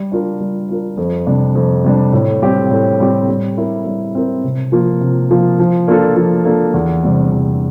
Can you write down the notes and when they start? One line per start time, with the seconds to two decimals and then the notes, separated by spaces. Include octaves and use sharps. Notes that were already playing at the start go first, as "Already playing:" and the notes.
Already playing: G3
0.12 D4 F4 A#4
0.40 G3
0.69 D4 F4 A#4
0.97 F2
1.27 C3 G3 D4
1.55 F2
1.84 C3 G3 D4
2.13 A2
2.42 G3 C4 G4
2.71 A2
3.00 G3 C4 G4
3.28 G3
3.58 C4 E4 A#4
3.86 G3
4.15 C4 E4 A#4
4.44 C3
4.72 F3 A#3 F4
5.01 C3
5.30 F3 A#3 F4
5.59 F3
5.88 A#3 D4 F4 A4
6.16 F3
6.45 A#3 D4 F4 A4
6.74 E2
7.03 C3 G3 C4
7.31 E2